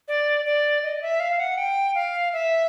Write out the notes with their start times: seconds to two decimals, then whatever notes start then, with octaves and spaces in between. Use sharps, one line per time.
0.08 D5
0.45 D5
0.83 D#5
1.02 E5
1.20 F5
1.40 F#5
1.58 G5
1.95 F5
2.33 E5